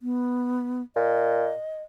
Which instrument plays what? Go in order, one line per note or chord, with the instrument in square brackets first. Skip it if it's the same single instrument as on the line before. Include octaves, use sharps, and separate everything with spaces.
[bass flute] B3
[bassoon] A#2 [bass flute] D#5